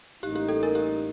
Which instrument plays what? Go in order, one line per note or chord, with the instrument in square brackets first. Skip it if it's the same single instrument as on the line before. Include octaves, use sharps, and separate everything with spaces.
[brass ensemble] A1 A2 G3 A#3 D#4 [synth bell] G4
[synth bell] G4
A4
A#4
G4